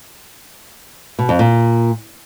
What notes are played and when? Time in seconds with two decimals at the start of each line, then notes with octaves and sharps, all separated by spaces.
1.19 B2
1.29 F2
1.39 A#2